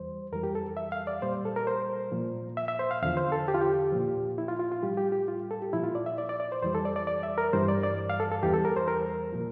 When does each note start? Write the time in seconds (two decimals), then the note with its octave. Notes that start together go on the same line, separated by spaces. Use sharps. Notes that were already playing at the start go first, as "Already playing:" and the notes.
Already playing: E2 E3 G3 C5
0.32 F2 E3 G3 A#4
0.43 G4
0.55 A4
0.77 E5
0.92 F5
1.07 D5
1.22 A#2 G3 C5
1.45 A4
1.56 A#4
1.67 C5
2.12 A#2 F3
2.57 E5
2.68 E5
2.79 C5
2.91 F5
3.02 E2 D3 F3 F5
3.17 C5
3.32 A4
3.48 G4
3.54 F4
3.61 G4
3.92 A#2 F3
4.38 E4
4.48 F4
4.60 F4
4.72 F4
4.83 A2 G3 G4
4.97 G4
5.12 G4
5.28 F4
5.51 A4
5.62 G4
5.73 A#2 F3 E4
5.84 F4
5.95 D5
6.06 E5
6.18 D5
6.29 D5
6.40 D5
6.52 C5
6.62 F2 E3 G3 C5
6.75 A4
6.85 D5
6.96 D5
7.07 D5
7.23 E5
7.38 A#4
7.53 G2 E3 G3 C5
7.68 D5
7.83 D5
8.10 F5
8.20 A4
8.32 A4
8.43 E2 E3 G3 G4
8.54 A4
8.65 A#4
8.77 C5
8.88 A#4
9.33 A#2 F3